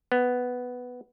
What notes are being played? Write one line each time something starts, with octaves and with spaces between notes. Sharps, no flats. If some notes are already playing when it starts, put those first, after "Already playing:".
B3